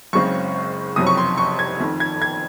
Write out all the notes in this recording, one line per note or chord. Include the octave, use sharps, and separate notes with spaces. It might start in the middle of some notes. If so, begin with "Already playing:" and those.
F#1 F#2 C#3 G#3 C4 C#6
F#1 F2 C3 F#3 D#6
C#6
C6
C#6
G#6
F1 F2 D#3
G#6
G#6